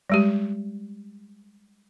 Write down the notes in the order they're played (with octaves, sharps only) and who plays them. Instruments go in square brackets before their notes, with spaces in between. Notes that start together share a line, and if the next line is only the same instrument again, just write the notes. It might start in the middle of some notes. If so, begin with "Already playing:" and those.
[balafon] G3 G#3 G4